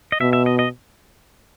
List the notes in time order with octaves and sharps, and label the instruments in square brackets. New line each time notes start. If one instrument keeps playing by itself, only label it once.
[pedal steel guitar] D#5
[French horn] B2 [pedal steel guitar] E5
[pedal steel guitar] E5
D#5
D#5